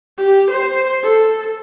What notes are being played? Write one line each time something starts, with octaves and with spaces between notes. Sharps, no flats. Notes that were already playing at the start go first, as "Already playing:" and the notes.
G4
C5
A4